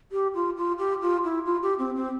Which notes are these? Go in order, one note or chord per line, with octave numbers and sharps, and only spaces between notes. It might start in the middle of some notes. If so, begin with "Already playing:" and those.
G4
F4
F4
G4
F4
E4
F4
G4
C4
C4